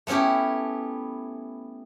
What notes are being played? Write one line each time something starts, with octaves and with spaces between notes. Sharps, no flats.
A3 B3 C#4 E4 G4